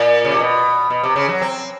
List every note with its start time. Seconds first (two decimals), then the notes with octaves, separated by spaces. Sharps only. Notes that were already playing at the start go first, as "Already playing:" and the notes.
Already playing: A#2
0.25 C#3
0.32 C3
0.39 B2
0.90 B2
1.03 C3
1.16 C#3
1.29 F#3
1.42 C4